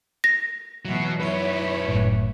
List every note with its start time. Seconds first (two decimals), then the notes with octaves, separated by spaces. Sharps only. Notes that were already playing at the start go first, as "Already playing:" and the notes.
0.24 A#6
0.85 B2 E3 F#3
1.20 F#2 E4 B4 C#5
1.88 F#1 A2